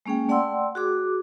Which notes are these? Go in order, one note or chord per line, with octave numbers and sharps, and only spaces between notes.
G#3 A#3 C#4 G#4 G5
A3 D5 F#5 G5 C6 E6
F#4 G#4 D6